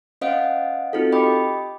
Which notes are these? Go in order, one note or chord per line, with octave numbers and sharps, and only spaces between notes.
C#4 C5 D#5 F5 F#5 D7
C4 D#4 F4 F#4 A4
G4 D#5 G5 B5 D6